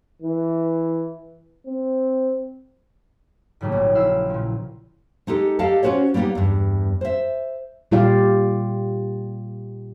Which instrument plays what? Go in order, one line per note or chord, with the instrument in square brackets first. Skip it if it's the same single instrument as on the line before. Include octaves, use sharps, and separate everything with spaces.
[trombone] E3
C4
[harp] G#2 C#3 F#3 G3 A3 A#3
A#1
E4 F5 E6
A#2 F3
[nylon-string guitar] G#3 D#4 G4 A4
G4 A4 D5 D#5 F5 A5
C#4 F4 F#4 C5 C#5
G3 A#3 B3 D#4 G4
E2 G2
C5 E5
[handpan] A#2 G3 F4 G4 D5 F5